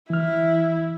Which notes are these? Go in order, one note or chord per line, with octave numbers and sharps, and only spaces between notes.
E3 E4 F6